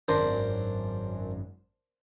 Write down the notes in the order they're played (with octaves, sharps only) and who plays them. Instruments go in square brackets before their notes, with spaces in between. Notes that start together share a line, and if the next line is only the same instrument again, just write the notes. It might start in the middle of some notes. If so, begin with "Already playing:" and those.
[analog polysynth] G#1 F#2 [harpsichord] D4 A#4 C5